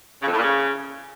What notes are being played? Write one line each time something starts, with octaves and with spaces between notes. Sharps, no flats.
C#3
F2
A2
A#2
C#3